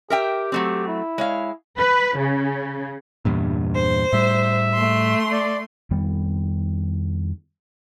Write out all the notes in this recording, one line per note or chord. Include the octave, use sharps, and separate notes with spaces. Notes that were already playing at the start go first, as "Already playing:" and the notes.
G4 A#4 E5 G5
F#3 A3 C4
E4
G#3 C#5 F5
B4
C#3
E2 G2 A#2
C5
A2 G3 E5
A3 C6
D5
F2 D#3 G3 B3